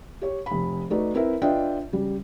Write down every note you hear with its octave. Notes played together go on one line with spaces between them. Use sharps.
G4 C#5
F1 B5
A3 D#4 F#4 B4 D5
C4 E4 A#4 B4 E5
D4 F4 B4 D#5 E5 G5
C#3 G3